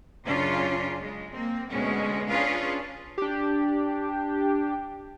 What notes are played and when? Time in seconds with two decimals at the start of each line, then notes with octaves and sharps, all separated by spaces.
0.25 F#2 C#3 C#4 D4 F4
1.01 G#3
1.32 A#3 C4
1.69 D2 B2 G#3 B3 C#4
2.27 C#4 D4 F4 G#4 B4 F5
3.18 D4 G4